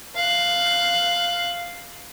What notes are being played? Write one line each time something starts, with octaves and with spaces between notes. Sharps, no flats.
F5 F#6